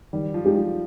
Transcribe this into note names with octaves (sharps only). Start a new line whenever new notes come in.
D#3 G3
F3
G#3 D#4 G4
F3